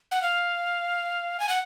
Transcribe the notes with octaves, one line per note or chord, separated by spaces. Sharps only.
F#5
F5
G#5
F#5